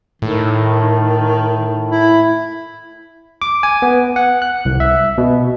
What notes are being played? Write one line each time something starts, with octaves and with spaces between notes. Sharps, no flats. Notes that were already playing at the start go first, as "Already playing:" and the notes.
A2 D#3
E4
D6
G#5
B3
F#5
F#6
C2
E5
B2